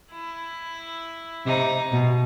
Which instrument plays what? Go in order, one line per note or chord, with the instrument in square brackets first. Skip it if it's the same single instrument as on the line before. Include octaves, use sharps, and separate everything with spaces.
[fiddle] E4
[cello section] C3 [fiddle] D#4
[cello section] B2